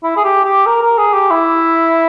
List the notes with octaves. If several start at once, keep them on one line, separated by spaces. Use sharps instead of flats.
E4
G#4
G4
G4
A#4
A#4
G#4
G4
E4